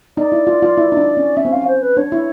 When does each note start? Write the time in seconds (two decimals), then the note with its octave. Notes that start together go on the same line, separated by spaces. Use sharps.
0.17 D#4 D5
0.32 E4
0.47 F4
0.62 F4
0.77 E4
0.92 D#4
0.97 D4
1.17 C#4
1.36 C#4 E5
1.45 C4
1.52 C#4 F5
1.67 C5
1.82 B4
1.97 D4 C#5
2.12 E4